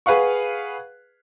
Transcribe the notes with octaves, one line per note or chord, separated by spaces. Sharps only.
G#4 B4 F5 F#5 C#6